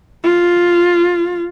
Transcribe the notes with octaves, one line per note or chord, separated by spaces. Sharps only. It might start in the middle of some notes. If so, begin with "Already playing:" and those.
F4